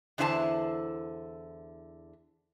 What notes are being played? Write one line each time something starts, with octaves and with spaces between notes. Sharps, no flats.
E2 D3 E4 C5 G#5 A5